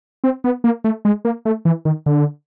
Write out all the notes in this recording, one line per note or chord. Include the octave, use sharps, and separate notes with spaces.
C4
B3
A#3
A3
G#3
A#3
A3
E3
D#3
D3